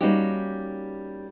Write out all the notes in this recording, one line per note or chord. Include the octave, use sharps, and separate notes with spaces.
G3 A#3 C#4 D#4 F#4 G4